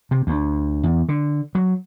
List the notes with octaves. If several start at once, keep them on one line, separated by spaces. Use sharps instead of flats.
C3
D2
E2
D3
F#3